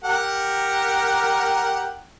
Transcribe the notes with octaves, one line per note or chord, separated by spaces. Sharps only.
G4 A#4 F#5